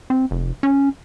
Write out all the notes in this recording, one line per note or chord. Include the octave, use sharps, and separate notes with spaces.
C4
F1
C#4